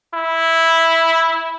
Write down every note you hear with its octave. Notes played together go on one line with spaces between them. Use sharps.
E4